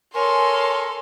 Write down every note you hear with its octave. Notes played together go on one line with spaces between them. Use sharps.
A4 A#4 C#5 G#5 C6